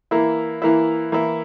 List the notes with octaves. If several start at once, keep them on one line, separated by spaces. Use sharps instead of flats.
E3 A#3 E4
E3 A#3 E4
E3 A#3 E4